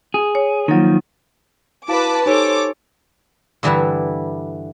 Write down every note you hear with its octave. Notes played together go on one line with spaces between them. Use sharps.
G#4
C#5
D#3 F3 F#3 A#3
E4 F#4 B4 F5 A5 D6
D#4 G4 A4 C5 C#5 G#5 D6
G2 D3 E3 G3 E4 A5